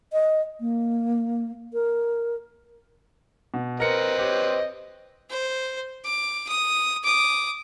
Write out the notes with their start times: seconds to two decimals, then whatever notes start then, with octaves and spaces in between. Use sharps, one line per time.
0.13 D#5
0.60 A#3
1.74 A#4
3.54 B2
3.80 C4 A#4 B4 D#5 C#7
4.19 G4 C#5
5.30 C5
6.04 D6
6.48 D#6
7.04 D6 D#6